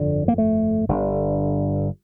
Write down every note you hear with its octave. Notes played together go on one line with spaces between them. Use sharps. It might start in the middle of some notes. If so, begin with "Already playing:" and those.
Already playing: G1 F2 D3
A#3
A3
G1 G2 D3